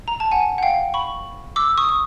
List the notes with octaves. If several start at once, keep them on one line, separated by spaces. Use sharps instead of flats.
A#5
A5
F#5 G#5
F#5
F5 G5
B5 C#6
D6 E6
C#6 D#6
D#6